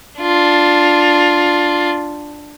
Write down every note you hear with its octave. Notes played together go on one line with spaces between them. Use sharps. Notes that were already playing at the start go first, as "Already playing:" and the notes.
D4 F4